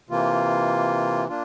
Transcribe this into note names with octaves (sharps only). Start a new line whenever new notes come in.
C3 E3 A#3 F4
A#3 D4 F4